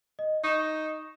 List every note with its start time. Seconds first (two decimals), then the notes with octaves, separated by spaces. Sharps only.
0.19 D#5
0.44 D#4 C#6 E7